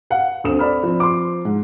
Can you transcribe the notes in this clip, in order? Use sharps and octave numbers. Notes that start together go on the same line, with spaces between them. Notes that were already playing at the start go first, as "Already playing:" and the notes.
F5 F#5
D2 C4 A4 D#6 E7
D5 B5 F6
F3 C4
C6 D6
G#2